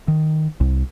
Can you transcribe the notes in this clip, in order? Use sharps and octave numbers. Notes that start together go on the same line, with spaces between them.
D#3
C2